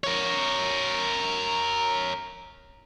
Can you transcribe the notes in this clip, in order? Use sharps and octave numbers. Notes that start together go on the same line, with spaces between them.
A#4 C#5